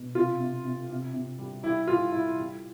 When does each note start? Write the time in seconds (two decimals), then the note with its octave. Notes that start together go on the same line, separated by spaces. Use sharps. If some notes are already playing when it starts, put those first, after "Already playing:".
Already playing: B2
0.15 C3 F4
0.40 C3
0.65 C3
0.89 C3
1.14 C3
1.39 G3
1.63 G3 E4
1.87 G3 F4
2.12 G3 E4
2.36 G3